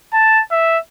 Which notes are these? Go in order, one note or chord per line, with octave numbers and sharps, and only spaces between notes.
A5
E5